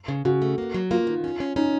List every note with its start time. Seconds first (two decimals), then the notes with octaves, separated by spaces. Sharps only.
0.08 C#3
0.25 C#3 F#4
0.42 A3
0.58 A#3
0.74 F#3
0.91 A#3 F4
1.07 D#3
1.24 C#4
1.40 C#4
1.56 C#4 D#4